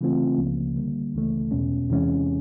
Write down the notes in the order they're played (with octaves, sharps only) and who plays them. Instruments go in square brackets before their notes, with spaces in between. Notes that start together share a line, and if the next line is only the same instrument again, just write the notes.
[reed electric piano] C#3 E3 A3 C4 F4
C#2 C#3 F3 A#3
D3 G3 A#3
C#2 C#3 E3 A3
E2 B2 G#3 C#4
E2 C3 E3 G#3 C#4